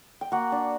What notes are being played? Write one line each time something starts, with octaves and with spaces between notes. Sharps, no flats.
G5
A#3 F#4 F#5
D4